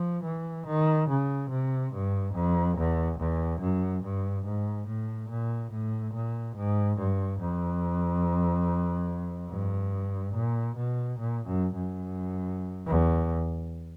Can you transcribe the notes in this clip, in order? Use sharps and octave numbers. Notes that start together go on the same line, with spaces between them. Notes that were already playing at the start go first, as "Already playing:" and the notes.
Already playing: F3
E3
D#3
C#3
C3
G2
F2
E2
E2
F#2
G2
G#2
A2
A#2
A2
A#2
G#2
G2
F2
G2
A#2
B2
A#2
F#2
F#2
E2